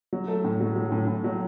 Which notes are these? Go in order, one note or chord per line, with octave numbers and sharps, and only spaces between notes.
F#3
A3
A2
F#3
F#3
A2
A2
F#3